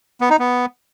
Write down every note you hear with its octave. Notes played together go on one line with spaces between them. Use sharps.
B3
D#4
B3